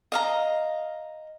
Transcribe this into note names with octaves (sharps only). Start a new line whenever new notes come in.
D#5 F5 A#5